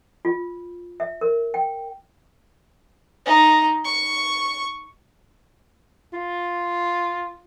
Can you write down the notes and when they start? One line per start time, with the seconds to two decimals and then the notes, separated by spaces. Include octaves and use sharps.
0.25 F4
1.00 E5
1.21 A#4
1.54 G5
3.26 D#4
3.84 C#6
6.13 F4